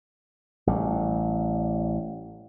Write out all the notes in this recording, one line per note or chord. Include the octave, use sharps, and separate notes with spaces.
A1 G3